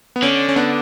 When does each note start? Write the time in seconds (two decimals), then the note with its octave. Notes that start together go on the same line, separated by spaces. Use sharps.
0.16 B3
0.22 D3 C#4
0.49 C#4
0.56 B3 D4